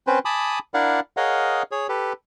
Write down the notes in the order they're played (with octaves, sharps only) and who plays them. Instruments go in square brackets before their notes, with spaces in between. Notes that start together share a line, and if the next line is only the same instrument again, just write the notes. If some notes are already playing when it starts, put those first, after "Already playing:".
[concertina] C4 C#4 B4 C5
G#5 A5 B5 D6 D#6
D4 E4 A#4 D5 F5 F#5
G#4 A#4 C#5 D#5 F5 F#5
G#4 C#5
G4 A4 B4